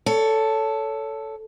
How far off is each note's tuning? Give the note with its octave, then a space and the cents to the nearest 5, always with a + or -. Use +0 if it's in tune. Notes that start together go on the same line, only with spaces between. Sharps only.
A4 +0 C#5 +20